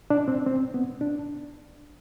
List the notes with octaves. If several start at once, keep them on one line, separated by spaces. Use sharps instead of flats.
D4
C4
C4
B3
D4